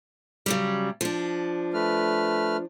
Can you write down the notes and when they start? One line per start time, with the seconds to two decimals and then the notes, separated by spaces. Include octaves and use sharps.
0.46 C#3 F#3 G3
1.01 F3 D4
1.74 A3 B4 F6